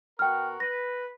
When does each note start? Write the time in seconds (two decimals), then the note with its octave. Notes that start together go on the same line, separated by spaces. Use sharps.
0.19 B2 F#4 A#4 G5 F6
0.60 B4 A#6